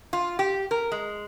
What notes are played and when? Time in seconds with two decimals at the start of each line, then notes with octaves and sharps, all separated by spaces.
0.13 F4
0.39 G4
0.71 A#4
0.92 G#3